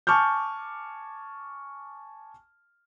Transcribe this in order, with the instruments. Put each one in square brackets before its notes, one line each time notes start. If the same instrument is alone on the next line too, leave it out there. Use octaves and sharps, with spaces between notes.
[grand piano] G#5 A5 C#6 D6 F6 G6